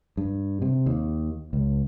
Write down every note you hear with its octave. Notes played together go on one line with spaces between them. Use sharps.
G2
C3
D#2
C#2